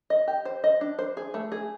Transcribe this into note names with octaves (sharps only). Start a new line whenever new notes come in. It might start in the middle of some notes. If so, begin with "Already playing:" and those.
D#5
G4
C5
D#5
D4
C5
G#4
A3
G#4